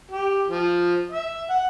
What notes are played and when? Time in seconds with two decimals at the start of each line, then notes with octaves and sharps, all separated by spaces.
0.11 G4
0.47 F3
1.12 E5
1.50 F#5